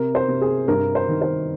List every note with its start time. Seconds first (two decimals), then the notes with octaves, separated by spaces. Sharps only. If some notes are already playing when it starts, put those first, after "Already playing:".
Already playing: C3 A#4
0.15 C5
0.28 C3
0.41 G#4
0.68 G2 A#4
0.95 C5
1.08 D#3
1.22 C5